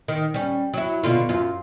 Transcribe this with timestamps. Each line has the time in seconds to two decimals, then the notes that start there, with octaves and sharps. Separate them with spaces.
0.08 D#3
0.34 G3 C#4
0.74 F#3 E4
1.03 B2 D3 F4
1.29 F#2 F4